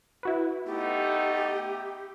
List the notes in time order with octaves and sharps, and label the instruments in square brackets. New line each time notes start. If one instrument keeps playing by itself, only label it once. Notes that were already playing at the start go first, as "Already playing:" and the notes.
[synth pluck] E4 F#4 B4
[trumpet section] A3 B3 D#4 [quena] G4